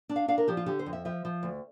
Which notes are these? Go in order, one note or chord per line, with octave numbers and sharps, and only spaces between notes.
D4
F5
D4 F5
A#4
F3 G4
F4
D3 G4
C5
F2
E5
F3 E5
F3
D2